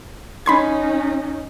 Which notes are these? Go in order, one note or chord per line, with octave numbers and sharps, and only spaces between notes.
C#4 D#4 B5 C6 G#6